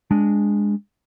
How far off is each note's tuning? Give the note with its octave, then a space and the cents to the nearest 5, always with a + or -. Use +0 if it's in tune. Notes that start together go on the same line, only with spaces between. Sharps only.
G#3 -15 D4 -5